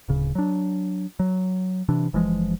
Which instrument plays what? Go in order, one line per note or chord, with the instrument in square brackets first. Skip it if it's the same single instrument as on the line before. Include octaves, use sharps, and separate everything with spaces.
[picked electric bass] D1 C#3
F#3 D4
F#3
C3 E3 D4
F#1 E3 F3 G#3